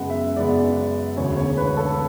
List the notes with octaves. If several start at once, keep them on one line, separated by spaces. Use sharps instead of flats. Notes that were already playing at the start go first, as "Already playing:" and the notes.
Already playing: F#2 C#3 G#3 B3 F#5
E5
F#2 C#3 G#3 B3 D5
E1 D2 C#3 C#5
C#5
B4
A4